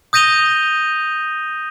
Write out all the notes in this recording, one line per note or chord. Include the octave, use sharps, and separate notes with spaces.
D#6 G6 A#6 D#7 F7 G7